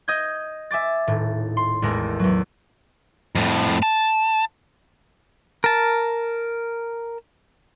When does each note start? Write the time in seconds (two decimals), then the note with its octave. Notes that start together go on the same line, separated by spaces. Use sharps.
0.08 D#5 D#6 G6 G#6
0.71 E5 G#5 D6 A6
1.07 D#1 A2
1.57 C6
1.82 A1 E2 G#3 A#4
2.19 E2 F#3
3.35 F2 A2
3.83 A5
5.64 A#4 A5